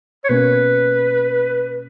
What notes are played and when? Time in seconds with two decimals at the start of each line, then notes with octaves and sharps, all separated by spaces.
0.24 C#5
0.29 B2 A#3 C#4 B4